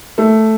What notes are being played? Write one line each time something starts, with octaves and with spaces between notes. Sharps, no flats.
A3